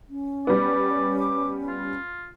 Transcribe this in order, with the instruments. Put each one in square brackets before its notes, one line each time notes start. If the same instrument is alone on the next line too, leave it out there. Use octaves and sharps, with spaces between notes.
[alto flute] C#4
[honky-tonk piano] G3 B3 [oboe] D5
[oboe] D6
F4